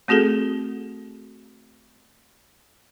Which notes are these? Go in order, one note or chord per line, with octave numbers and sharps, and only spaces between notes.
A3 C4 F#4 G#4 A4